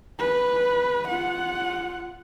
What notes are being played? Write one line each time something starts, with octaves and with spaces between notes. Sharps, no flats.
B4
F4 F#5